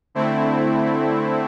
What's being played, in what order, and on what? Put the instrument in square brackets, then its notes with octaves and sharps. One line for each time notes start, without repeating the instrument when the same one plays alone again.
[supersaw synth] D3 A3 C4 E4